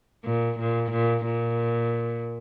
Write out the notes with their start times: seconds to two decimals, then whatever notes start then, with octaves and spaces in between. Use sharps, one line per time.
0.25 A#2
0.59 A#2
0.91 A#2
1.25 A#2